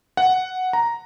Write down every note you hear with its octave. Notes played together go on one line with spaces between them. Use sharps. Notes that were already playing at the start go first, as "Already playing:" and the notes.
F#5
A#5